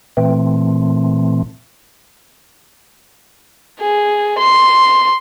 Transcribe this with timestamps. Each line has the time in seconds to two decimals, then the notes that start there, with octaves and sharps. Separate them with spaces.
0.17 A#2 E3 A3 C4
3.80 G#4
4.39 C6